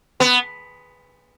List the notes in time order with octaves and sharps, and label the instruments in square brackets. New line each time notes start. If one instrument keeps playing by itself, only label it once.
[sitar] B3